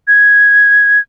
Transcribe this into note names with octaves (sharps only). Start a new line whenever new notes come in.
G#6